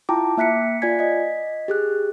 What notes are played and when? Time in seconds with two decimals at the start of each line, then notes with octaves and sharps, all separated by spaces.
0.09 E4 F4 G5 A5 A#5 D6
0.37 A#3 E5 F#6 B6 C#7
0.82 F4 D5 G#5 G#6 B6
0.99 D#5 B6
1.68 G4 G#4 F#6